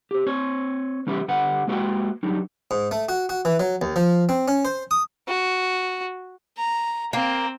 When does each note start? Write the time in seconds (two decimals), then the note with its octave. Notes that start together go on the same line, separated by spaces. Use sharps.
0.11 G4 C5
0.26 C4 C5 C#5
1.07 E3 G3 C#4 G4 B4 E5
1.28 D3 G3 B4 F#5
1.67 G#3 A#3 F#4 B4 F#5 G5
2.23 F#3 G3 D4 D#4
2.71 G#2
2.91 A3
3.09 F#4
3.29 F#4
3.45 E3
3.60 F#3
3.82 D#2
3.96 F3
4.29 C4
4.48 C#4
4.65 C5
4.91 D#6
5.28 F#4
6.58 A#5
7.13 A#3 C4